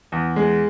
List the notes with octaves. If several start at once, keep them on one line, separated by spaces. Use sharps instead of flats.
E2
G#3